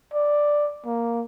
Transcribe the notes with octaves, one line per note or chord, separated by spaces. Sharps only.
D5
A#3